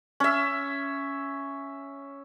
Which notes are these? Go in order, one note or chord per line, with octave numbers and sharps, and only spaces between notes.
C#4 E5